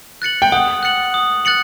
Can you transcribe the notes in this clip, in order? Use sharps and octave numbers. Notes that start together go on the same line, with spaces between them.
F#6 A6 C#7 F#7
G5
F#5 D#6
F#6 A6 C#7 F#7
D#6
F#6 A6 C#7 F#7